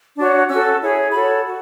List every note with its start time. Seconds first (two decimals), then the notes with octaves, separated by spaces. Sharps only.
0.17 D4 F#4 C#5
0.49 C#4 F#4 A4 E6
0.81 E4 G#4 C#5
1.12 F#4 A4 C#5 B5
1.45 F#4